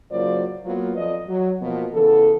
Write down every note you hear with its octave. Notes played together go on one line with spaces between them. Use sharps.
C#3 F#3 A#3 F4 C5 D5
F#3 A#3 B3 F4
F2 F3 D5 D#5
F#3
B2 F3 A#3 B3
C#3 E3 B3 A4